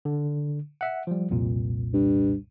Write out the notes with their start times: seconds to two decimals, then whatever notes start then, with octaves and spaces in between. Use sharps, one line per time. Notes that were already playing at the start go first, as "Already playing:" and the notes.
0.05 D3
0.81 E5 F#5
1.07 F3 G3
1.30 C2 F2 A#2
1.93 G2